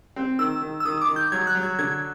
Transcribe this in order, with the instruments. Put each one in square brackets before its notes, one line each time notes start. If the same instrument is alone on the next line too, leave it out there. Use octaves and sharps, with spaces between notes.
[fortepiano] C4
[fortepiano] D#3 [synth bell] E6
[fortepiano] D#3
[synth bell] E6
[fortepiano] D#3 [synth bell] D#6
[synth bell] D6
[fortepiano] D#3
[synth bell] G6
[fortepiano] F#3 [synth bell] G#6
[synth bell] F#6
[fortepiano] F#3
[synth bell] G#6
[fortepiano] D3 [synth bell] G#6